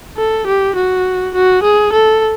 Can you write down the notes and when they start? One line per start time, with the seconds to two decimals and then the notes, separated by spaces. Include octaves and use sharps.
0.17 A4
0.47 G4
0.75 F#4
1.35 F#4
1.63 G#4
1.93 A4